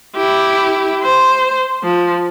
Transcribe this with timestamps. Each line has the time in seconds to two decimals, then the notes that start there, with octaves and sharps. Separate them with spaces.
0.16 E4 G4
1.03 C5
1.84 F3